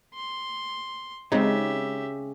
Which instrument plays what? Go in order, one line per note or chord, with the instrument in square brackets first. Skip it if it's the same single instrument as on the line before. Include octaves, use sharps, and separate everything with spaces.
[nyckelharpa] C6
[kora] C#3 [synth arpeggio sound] G#3 C4 D#4 [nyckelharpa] G4 E5